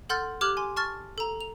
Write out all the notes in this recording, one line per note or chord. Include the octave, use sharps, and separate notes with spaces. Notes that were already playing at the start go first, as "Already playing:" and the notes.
A4 F#5 C6 F6 G6 A6
G4 D6 F6 F#6 G#6 F#7
G#5 C6
A5 C#6 F6 A6
A4 A#5
F7